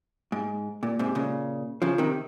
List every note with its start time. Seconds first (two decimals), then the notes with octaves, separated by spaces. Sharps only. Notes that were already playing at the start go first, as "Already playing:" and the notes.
0.32 G#2
0.83 A#2
0.99 G#2 C3
1.15 A#2 C#3
1.82 C#3 F3
1.98 C3 D#3